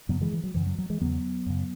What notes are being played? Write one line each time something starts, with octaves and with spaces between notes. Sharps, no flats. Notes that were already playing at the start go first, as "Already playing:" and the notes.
F#2 C#3 F#3 B3
E3 G#3
E3
F#3
F#2 C#3 E3
F#3
F#3
E3 G#3
E2 C#3 F#3 B3
F#2 C#3